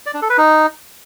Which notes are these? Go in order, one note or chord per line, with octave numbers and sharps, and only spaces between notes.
D5
D4
A4
B4
D#4